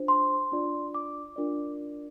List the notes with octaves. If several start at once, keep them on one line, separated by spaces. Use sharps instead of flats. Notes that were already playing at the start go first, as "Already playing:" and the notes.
Already playing: D4 F4 C5
C6
D4 F4 D5
D6
D4 F4 A#4 D5